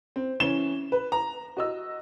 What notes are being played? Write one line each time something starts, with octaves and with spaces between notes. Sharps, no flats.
C4
E3 C#4 E7 G7
B4
A#5
F#4 D#5 E6